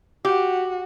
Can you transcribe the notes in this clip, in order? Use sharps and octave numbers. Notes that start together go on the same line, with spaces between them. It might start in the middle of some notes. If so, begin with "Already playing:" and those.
F#4 G4